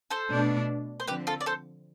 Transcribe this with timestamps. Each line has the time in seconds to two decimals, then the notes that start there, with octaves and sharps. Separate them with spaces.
0.10 A4 C5
0.30 B2 A3 D4
1.00 C5
1.07 D3 F3 C4 G4 B4
1.27 F4 A4
1.41 D5
1.46 A4 C5